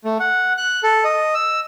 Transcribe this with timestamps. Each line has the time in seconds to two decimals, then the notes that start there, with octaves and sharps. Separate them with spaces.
0.05 A3
0.20 F#5
0.57 F#6
0.83 A4
1.04 D#5
1.34 E6